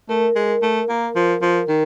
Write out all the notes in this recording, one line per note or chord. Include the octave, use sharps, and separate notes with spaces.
A3 A#4
G#3
A3
A#3
F3
F3
D#3 A#4